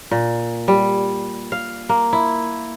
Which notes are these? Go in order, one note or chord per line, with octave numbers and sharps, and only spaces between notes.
A#2
G3
F5
A#3
E4